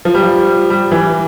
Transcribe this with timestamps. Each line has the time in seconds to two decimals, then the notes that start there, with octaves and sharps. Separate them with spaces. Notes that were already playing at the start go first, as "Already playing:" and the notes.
0.05 F3
0.14 G3
0.22 F3
0.70 G3
0.91 E3